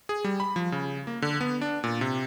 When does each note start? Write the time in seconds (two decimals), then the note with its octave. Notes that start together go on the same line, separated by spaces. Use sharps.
0.09 G#4
0.24 G3
0.40 B5
0.56 F3
0.72 C#3
1.07 A#3
1.22 D3
1.41 B3
1.61 D4
1.84 A#2
2.01 C3